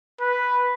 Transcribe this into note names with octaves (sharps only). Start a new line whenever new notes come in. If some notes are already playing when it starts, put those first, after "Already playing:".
B4